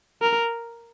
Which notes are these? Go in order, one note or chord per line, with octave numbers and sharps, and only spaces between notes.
A#4